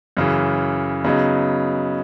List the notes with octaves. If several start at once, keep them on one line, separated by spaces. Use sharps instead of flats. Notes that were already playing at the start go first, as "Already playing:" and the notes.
F#2 C#3 E3
C#3 F#3 B3 D#4